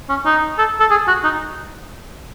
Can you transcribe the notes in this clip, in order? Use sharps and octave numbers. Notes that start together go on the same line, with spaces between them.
C#4
D#4
A4
A4
G#4
F#4
D#4